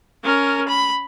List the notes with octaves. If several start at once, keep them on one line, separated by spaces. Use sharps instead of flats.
C#4 A#4
B5